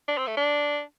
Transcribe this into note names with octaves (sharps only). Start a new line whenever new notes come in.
D4
C4
A3
D4